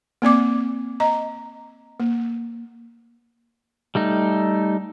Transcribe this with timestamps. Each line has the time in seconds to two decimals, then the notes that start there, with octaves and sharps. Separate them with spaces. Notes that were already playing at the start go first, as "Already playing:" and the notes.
0.22 A#3 C4 D5 D6
1.00 D#5 A#5
2.00 A#3
3.95 G3 A3 D#4